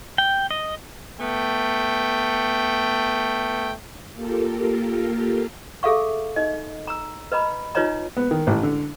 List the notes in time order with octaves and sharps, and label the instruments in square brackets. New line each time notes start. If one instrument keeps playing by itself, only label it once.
[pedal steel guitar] G5
D#5
[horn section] A3 B3 G5
[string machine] A#3 F4 G4 A4 A#4
[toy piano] G#4 A4 E5 F5 C#6
D#4 D#5
A#5 E6
B4 D#5 A#5 B5
D#4 F4 B4 C#5 D#5 A#5
[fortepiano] B3
D#3
A1
D3